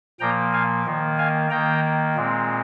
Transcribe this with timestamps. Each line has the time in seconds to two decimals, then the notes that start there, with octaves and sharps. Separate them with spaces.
0.20 A#2 F3 A#3 G5 A#5
0.53 F5 G#5
0.85 D#3 A#3
1.18 F5 G#5
1.50 D#3 A#3 G5 A#5
2.15 A#2 G#3 C4